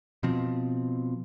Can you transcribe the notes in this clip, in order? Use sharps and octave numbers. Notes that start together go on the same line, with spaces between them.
B2 F3 C4